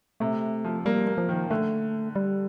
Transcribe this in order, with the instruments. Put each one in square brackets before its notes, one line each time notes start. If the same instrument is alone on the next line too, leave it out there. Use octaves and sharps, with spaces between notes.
[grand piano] C3 [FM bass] A3
[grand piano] F3
[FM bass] G3 [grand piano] A#3
[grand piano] A#3
[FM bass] F3
[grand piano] D#3
[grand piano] D3 [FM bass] A3
[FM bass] G3